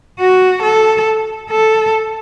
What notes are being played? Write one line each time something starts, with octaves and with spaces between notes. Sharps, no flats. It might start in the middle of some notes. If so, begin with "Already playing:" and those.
F#4
A4
A4